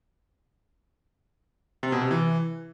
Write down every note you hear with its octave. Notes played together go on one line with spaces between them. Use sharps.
C3
B2
C3
E3